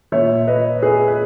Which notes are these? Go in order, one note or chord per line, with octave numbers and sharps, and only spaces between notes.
A#2 C#5 E5
B4 D#5
G#4 B4
B4